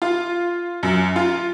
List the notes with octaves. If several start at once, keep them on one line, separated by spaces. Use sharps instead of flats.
F4
F#2
F4